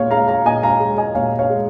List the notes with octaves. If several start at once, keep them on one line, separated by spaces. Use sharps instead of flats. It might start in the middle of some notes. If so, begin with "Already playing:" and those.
Already playing: A#2 G#3 C#5 F5
G#3 F5 A#5
F5 A#5
A#2 D#5 G#5
F5 A#5
G#3
D#5 G#5
A#2 C#5 F5
C#5 F5
G#3